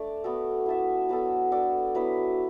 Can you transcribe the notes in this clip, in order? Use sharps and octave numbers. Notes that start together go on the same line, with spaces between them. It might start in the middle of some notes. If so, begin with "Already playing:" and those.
Already playing: A3 D4 D5
B3 F#4 A4
E4 A4 E5
F#3 B3 F#4 A4
D4 A4 D5
F#3 B3 E4 B4